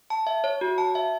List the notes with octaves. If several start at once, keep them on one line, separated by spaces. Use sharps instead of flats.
A5
E5
C#5
F#4
A5
E5